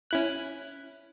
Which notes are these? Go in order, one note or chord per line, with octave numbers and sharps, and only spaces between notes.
C#4 E4 F#6